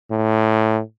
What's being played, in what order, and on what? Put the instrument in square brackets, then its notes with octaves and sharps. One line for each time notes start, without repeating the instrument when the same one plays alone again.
[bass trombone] A2